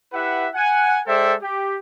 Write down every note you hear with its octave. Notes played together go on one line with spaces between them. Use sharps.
E4 G4 B4 E5 F#5
F#5 G#5
G#3 A4 C5 D5 E5 G5
G4